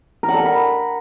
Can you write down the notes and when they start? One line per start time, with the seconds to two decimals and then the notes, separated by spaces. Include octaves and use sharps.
0.23 A#4
0.29 F#5
0.34 A4
0.40 A#4
0.45 B5